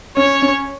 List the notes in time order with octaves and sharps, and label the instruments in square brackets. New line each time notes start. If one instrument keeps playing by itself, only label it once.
[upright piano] C#4 [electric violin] C#5
[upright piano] C#4